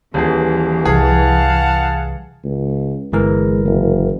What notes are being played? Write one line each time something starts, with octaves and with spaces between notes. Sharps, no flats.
D#1 E3 G#4
C2 F#2 G#4 F5 F#5 A5
C#2
G1 E3 G#3 A#4
F#1